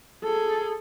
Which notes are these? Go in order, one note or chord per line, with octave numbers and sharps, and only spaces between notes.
G#4 A4